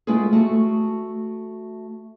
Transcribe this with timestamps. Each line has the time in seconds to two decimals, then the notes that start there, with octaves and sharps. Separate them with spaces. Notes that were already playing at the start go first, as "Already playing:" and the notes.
0.07 G#3 A3 B3 E4 F4 G#4
0.33 A3 F#4